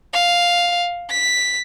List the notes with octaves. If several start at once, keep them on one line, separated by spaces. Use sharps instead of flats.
F5
B6